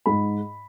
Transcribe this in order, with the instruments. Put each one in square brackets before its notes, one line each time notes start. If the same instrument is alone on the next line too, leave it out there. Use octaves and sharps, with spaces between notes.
[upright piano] G#2 B5